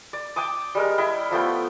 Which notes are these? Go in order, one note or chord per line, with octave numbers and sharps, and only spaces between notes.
D5
G5 A5 D6 D#6
G3 G#3 A#4
E4 D#5 G5
F3 A3 B3 G5